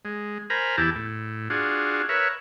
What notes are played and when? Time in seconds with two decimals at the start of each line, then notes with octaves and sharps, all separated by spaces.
0.05 G#3
0.50 A#4 C5 G#5 A#5 B5
0.78 E2 E4 G4 A5
0.96 A2
1.50 D4 F4 F#4 G#4
2.09 A#4 B4 C#5 E5